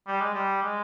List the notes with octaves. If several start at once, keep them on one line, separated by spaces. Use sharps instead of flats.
G3
G#3
G3
G#3